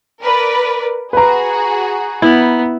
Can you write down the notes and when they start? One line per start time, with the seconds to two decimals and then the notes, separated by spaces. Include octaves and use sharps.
0.22 A#4 B4 D5
1.13 F#4 G#4 B4 A#5
2.22 B3 E4